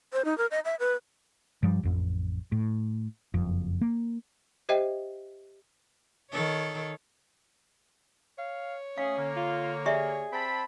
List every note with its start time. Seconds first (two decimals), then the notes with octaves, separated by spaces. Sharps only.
0.13 C5
0.25 D#4
0.38 A#4
0.51 D#5
0.65 E5
0.80 B4
1.63 G2 F3 G3
1.83 A1 F2
2.52 A2
3.34 F#1 F2
3.81 A#3
4.69 G4 C5 D#5 E5 G5
6.32 D#3 A4 C#5
8.38 C#5 F5
8.98 A3 C#4 G#4 F5
9.16 D3 A#3
9.36 F4
9.86 G4 G#4 D5 E5
10.32 C4 A5 B5